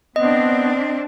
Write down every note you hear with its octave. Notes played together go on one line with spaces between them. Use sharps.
B3 C4 D4 D#5